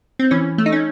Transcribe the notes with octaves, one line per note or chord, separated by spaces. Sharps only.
C4
E3 C#4
A3
D#4
C#4